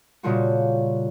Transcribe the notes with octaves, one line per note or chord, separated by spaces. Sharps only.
A#2 C#3 G3 A3 F4 F#4